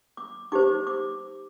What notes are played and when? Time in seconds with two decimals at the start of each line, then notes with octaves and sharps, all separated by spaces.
0.17 D6
0.52 D#4 G4 C5 D6
0.87 D6